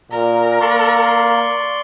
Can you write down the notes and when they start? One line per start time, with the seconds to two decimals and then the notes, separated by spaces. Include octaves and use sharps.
0.12 A#2 A#4
0.61 A#3 D5 C6 C#6